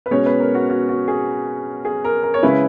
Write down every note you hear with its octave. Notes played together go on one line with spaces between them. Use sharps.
B4
B2 G#3 C#4 C#5
B4
A#4
F#4
F#4
F#4
G#4
G#4
A#4
A#4
C#5
C#3 G#3 C#4 E4 B4